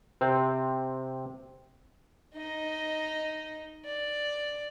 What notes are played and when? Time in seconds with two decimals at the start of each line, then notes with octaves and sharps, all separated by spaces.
0.21 C3 C4
2.34 D#4 D#5
3.85 D5